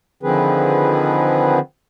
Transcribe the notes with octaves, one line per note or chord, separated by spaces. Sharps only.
D3 D#3 F3 C4 G#4 B4